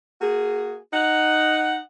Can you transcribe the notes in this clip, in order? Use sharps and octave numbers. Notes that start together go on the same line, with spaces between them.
A#3 F#4 G#4
D#4 F#5